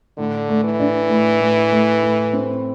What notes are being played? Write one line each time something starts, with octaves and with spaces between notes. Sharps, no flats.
A2 D3
A3
E3
D4
A2
A2
A3
A2
C4